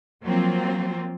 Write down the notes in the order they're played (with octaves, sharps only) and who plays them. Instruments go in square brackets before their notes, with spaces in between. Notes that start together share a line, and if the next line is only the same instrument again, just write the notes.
[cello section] F3 F#3 A#3 C4 F4